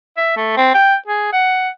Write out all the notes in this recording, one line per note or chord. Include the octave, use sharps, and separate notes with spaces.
E5
A3
C4
G5
G#4
F#5